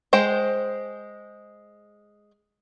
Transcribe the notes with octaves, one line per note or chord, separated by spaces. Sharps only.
G#3 C5 G5